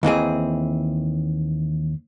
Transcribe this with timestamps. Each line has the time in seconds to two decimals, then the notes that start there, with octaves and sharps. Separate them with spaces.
0.03 D#2 E3 C4 G#4